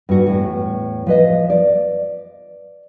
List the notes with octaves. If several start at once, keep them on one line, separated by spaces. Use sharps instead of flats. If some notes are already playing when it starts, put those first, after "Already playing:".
G2 F#4
E2 A2
F3 B4 D#5
D5